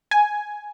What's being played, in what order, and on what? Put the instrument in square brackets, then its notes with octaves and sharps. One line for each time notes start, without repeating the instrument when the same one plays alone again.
[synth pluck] G#5